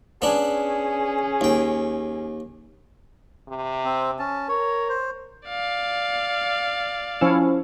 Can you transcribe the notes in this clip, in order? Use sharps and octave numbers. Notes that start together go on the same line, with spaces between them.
B3 C#4 D4 G#4
D#2 G5
C3
C4
C#4 A5
A#4 C#5
C5
D5 F5
F3 C#4 E4